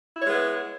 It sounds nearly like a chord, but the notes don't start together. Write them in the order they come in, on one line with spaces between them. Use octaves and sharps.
E4 C#5 G#3 B3